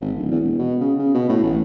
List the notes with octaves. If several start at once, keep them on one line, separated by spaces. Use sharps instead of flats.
G#1
D1
E2
E1
B2
C#3
C#3
B2
A2
A1